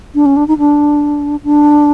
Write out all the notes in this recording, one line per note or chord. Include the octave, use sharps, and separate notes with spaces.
D4
C#4
D4
D#4
D4
D4